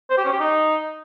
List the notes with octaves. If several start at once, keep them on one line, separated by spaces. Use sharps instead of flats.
C5
G4
C#4
G4
D#4